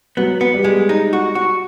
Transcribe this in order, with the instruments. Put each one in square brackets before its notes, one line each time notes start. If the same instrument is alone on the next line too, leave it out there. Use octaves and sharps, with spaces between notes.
[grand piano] F#3 [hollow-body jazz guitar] B3
[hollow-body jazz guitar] B3
[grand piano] G3
[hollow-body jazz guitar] G#3
D#4
F#4
F#4